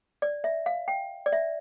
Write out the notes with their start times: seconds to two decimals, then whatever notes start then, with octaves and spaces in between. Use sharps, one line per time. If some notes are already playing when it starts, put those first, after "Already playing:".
0.22 D5
0.44 E5
0.66 F5
0.88 G5
1.26 D5
1.33 E5